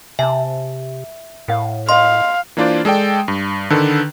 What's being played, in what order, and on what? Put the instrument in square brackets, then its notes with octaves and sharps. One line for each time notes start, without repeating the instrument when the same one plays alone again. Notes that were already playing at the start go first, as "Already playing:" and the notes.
[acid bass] C3 [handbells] E5 [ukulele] G#5 A5
[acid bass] A2 [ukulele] A#4 F5 F#5
[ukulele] C#5 D#5 [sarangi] F5 [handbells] C6
[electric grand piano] E3 A#3 D4 F4 C5 D5
G#3 A4 D5 G5
G2
D3 D#3 D4 A4 B4